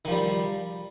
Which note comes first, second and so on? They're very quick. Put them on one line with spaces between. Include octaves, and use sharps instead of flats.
D#3 F3 G3